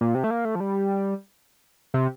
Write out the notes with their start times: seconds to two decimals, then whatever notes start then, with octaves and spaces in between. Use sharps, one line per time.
0.01 A#2
0.15 C3
0.24 A3
0.31 A#3
0.45 A3
0.55 F3
0.60 G3
1.94 C3